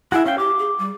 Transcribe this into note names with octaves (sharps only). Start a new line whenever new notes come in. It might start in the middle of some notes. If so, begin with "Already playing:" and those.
E4 F#4 G#4 E5
C#4 F5 G5
G4 D6
G#4
G3